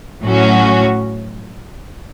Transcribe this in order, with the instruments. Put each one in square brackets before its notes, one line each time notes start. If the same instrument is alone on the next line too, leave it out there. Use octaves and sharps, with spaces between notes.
[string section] A2 F#3 C#4 F#4